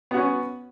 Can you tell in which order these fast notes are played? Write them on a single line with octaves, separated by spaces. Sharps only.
B3 F#4 C#4